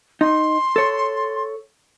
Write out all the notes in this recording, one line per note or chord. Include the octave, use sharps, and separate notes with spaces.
D#4 C6
A4 C#5